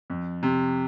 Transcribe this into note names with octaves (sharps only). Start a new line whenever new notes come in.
F2
C3